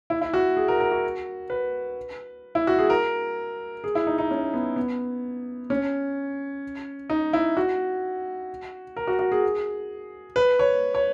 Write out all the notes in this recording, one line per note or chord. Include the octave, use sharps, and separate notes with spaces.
E4
E4
F#4
G#4
A#4
A#4
F#4
B4
E4
F#4
G#4
A#4
G#4
E4
D#4
D#4
C#4
B3
B3
C#4
D#4
E4
F#4
A#4
F#4
F#4
G#4
B4
C#5
C#5